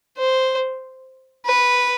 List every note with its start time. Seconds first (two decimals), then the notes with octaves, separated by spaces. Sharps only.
0.18 C5
1.46 B4